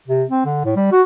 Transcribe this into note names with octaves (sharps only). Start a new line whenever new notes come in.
C3
C4
D3
A2
G3
F#4